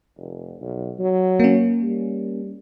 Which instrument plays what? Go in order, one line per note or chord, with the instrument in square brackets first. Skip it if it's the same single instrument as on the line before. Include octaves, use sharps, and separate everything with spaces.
[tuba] F1
B1
F#3
[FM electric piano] A#3 C#4
[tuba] G3